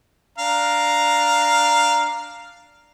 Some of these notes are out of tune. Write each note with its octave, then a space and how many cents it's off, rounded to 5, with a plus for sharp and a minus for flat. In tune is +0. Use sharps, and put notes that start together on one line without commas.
D4 +0 F5 +0 A#5 +0